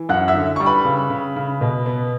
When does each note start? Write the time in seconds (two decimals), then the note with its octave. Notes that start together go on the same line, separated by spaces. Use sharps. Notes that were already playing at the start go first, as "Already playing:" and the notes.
Already playing: E3
0.09 F#2 F#5 F#6
0.28 E5 E6
0.35 D3
0.56 G3 C#6
0.66 B4 B5
0.85 C#3
1.10 C#3
1.36 C#3
1.61 B2
1.86 B3